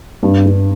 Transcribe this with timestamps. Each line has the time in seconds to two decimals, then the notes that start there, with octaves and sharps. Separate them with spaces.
0.23 G2
0.45 G2